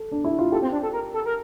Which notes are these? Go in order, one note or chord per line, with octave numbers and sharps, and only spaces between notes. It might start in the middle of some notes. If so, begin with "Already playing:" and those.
Already playing: A4
D4
E4
F4
G4 A4
C4
D4
A4
A#4
A4
A#4